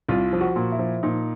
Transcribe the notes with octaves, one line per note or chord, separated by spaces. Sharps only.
C2 F4
F3
F#4
A#2
E4
F3
A#2 D#4